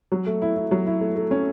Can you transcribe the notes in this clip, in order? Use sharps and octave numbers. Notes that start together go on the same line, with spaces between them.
F#3
A3
E4
E4
F#3
E4
A3
A3
C#4